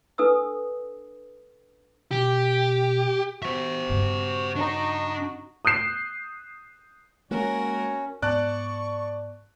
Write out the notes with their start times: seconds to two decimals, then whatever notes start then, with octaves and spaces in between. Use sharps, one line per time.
0.18 D4 A4 B4 D#6 E6
2.11 B2 G4
3.43 F#4 C5 E5
3.90 G2 C#3
4.56 D4 D#4
5.65 D#6 F#6 G6 C7 E7
7.31 G#3 A#3 C#4 F#4 A#4 C#5
8.22 G#2 B3 D5 A5 C#6 F#6